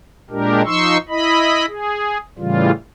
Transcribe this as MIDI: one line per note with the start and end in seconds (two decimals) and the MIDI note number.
0.31 0.62 46
0.31 0.62 56
0.31 0.62 62
0.31 0.62 67
0.31 0.62 70
0.65 0.97 53
0.65 0.97 63
0.65 0.97 84
0.65 0.97 85
0.65 0.97 88
1.09 1.66 64
1.09 1.66 75
1.09 1.66 83
1.68 2.18 68
2.39 2.71 45
2.39 2.71 49
2.39 2.71 52
2.39 2.71 55
2.39 2.71 65